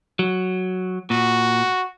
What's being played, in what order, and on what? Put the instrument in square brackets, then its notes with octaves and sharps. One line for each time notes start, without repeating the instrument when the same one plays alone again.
[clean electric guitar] F#3
[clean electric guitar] A#2 [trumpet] F#4